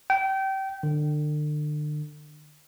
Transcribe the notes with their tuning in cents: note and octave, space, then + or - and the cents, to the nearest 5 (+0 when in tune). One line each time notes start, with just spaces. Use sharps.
G5 -25
D3 +35